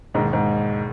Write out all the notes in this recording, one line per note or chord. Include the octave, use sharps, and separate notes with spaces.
E1 D#2 G#2 D#3
G#2